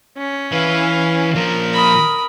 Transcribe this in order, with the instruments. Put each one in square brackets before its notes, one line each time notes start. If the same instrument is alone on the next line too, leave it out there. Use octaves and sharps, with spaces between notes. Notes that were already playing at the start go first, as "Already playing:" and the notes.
[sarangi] C#4
[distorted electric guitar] E3 B4 [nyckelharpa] F5
[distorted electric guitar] A#2 F3 [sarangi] A#4
[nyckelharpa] B5 D#6